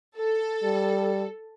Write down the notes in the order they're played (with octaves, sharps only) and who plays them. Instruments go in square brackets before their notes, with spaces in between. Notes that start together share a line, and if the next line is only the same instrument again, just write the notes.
[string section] A4
[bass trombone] G3